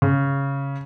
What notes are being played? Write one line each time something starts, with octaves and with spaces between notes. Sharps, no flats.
C#3